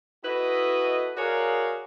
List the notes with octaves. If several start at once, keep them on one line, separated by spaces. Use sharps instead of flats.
E4 F#4 A4 B4 D#5
F#4 G#4 A#4 C#5 D5 F5